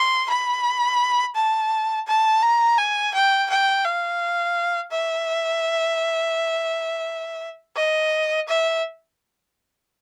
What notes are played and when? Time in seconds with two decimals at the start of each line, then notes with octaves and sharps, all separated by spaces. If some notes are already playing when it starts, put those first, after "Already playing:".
Already playing: C6
0.29 B5
1.35 A5
2.07 A5
2.43 A#5
2.78 G#5
3.14 G5
3.50 G5
3.84 F5
4.91 E5
7.76 D#5
8.48 E5